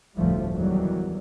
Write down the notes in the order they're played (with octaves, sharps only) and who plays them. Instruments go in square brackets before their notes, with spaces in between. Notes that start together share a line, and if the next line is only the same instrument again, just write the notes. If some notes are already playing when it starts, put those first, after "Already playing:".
[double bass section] F1 D2 A2 F3 G3 A3
E2 D#3 F#3 G3